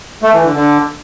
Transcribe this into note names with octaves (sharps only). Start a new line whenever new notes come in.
A3
E3
D3
D3